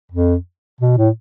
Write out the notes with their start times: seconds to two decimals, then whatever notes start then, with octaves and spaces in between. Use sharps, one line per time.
0.12 F2
0.81 B2
0.97 A2